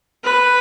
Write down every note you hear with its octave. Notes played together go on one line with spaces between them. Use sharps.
B4